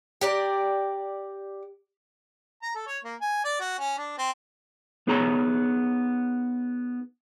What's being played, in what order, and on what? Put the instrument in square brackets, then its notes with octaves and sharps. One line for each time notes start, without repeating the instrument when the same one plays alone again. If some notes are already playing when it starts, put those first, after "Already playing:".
[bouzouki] G4 D5 A#5
[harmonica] A#5
A4
C#5
A#3
G#5
D5
F#4
C#4
D4
C4
[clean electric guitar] B3 D#4 G#4 C#5 A#5